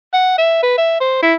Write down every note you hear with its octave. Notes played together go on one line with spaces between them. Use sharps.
F#5
E5
B4
E5
C5
E4